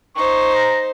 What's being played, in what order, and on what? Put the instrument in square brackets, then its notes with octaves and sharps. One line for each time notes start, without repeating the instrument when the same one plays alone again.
[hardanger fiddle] D#4 C5 [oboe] C#6
[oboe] A#5